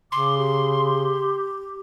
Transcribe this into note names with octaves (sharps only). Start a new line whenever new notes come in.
C#3 C6 D6
G4